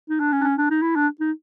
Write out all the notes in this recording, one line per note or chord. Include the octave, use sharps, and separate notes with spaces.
D#4
D4
C#4
D4
C#4
D4
D#4
E4
D4
D#4